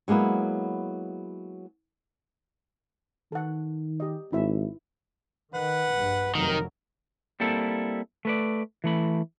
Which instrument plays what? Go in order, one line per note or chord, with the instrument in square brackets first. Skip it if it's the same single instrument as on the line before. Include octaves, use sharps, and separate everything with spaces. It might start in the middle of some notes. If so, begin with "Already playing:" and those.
[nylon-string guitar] F#3 G#3 A#3 B3 E4
[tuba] D#3 [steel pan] A4 F#5
[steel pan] G4 D#5
[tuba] G#1 [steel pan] D#4 E4 E5
[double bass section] D#3 [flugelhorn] B4 [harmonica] F#5
[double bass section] A#1 G2
[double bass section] F1 F2 F#3 [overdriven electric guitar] D#3 [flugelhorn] A#4
[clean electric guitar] G3 A#3 C4 E4 A4
A3 B4 D5
E3 A3 B5